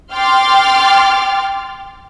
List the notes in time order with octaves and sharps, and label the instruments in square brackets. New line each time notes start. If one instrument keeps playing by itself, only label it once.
[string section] G5 C6 D6 F6 A6